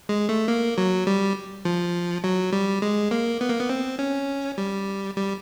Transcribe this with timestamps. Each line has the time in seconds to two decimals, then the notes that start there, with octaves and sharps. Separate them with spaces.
0.09 G#3
0.29 A3
0.48 A#3
0.78 F#3
1.07 G3
1.65 F3
2.24 F#3
2.53 G3
2.82 G#3
3.11 A#3
3.41 B3
3.50 A#3
3.59 B3
3.69 C4
3.99 C#4
4.58 G3
5.16 G3